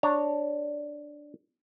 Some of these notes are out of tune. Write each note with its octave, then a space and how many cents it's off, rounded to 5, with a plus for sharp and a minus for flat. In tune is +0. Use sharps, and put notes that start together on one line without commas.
D4 +0 C#5 +0 A#5 -20